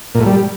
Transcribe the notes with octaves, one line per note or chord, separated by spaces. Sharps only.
A#2
A2
G3